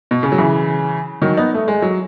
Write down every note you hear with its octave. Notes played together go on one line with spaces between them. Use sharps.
B2
C#3
F#3
C#3 E3
D#3 F#3
B3 D#4
A3
G#3
F#3